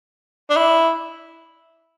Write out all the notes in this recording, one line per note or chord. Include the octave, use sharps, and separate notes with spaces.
D4
E4